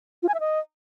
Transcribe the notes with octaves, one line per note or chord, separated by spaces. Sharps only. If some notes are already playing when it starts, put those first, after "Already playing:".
F4
G#5
E5
D#5